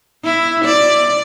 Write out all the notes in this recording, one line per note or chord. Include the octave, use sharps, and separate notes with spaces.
E4
D5